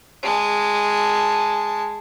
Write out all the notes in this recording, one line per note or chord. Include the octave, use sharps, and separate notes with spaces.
G#3 A5